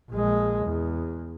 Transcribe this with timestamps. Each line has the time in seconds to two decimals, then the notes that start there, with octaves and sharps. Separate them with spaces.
0.11 A#1 G#3
0.65 E2